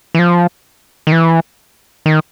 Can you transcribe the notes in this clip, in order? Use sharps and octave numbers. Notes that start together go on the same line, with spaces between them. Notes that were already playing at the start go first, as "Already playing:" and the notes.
E3
F3
D#3
E3
D#3